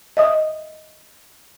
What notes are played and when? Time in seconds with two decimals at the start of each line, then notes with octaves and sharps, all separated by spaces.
0.17 D#5 E5 D#6